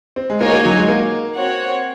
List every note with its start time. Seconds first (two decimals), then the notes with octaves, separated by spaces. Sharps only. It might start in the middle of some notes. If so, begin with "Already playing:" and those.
0.16 C4
0.30 G#3
0.41 A#3 D#4 F#4 C#5 G#5
0.52 A#3
0.65 F#3
0.77 G#3
0.88 A#3
1.37 C4 F#4 C#5 F#5